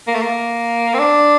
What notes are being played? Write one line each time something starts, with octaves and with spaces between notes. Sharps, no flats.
A#3
A3
A#3
C4
D4